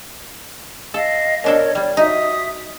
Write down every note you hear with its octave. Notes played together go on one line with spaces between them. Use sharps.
A4 D#5 F5
B2 D4 A4 A#4 C#5
G3 C#5 D5 G5
D#4 F#4 E5 D#6